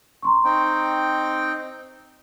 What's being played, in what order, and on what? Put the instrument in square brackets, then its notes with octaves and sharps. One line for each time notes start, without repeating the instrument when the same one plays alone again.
[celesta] A#5 C6 C#6
[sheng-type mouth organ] C4 D#4 G5